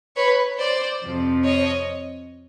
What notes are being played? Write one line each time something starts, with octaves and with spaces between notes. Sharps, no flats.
B4 C#5
C5 D5
F2 C3 F3
C#5 D#5